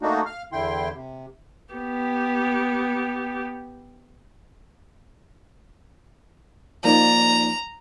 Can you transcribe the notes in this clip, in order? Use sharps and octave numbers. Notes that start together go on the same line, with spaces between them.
A3 A#3 D4 D#4 F#4
F5 F6
E2 D3 E4 G5 C6
C3
B3 G4
F3 A#3 D#4 D5 A#5